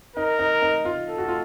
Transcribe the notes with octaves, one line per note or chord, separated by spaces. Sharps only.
D#4 A#4
D#4
D#4
F4
A4
F#4
F4